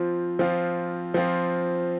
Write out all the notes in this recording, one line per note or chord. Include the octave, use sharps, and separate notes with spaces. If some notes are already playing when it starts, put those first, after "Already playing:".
Already playing: F3 C4 F4
F3 C4 F4
F3 C4 F4